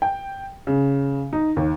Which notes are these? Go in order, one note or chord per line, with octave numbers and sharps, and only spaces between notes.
G5
C#3
D#4
D#2